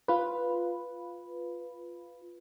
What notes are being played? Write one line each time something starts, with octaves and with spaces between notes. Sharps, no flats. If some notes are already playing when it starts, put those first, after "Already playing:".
F4 B4